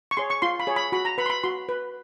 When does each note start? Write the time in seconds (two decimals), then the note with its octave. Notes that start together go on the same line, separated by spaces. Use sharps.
0.11 C#6
0.17 G#4 C#5 C6
0.30 C#6
0.42 F4 C6
0.60 B5
0.67 G#4 C#5
0.76 B5
0.92 F#4 B5
1.05 A#5
1.18 B4 B5
1.26 C6
1.30 B5
1.43 F#4 C6
1.69 B4